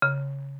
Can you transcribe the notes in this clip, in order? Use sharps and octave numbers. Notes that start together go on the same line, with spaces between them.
C#3